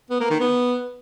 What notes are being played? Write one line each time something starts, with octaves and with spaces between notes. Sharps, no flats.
B3
A#3
D#3
B3